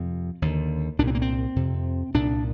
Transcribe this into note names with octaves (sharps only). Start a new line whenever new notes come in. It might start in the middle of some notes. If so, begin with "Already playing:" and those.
Already playing: F2 C3
D#2 D3
C2 A#2 D4
C4
A#3
C4
F2 C3
C2 A#2 D4